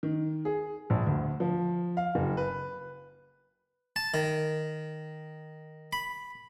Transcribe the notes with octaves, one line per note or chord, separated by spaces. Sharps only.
D#3
G#4
A#1
D2
F3
F5
F#1
B4
A5
D#3
B5